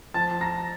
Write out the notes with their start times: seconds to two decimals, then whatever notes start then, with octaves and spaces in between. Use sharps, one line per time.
0.14 F3 A5 A6
0.41 A#5 A#6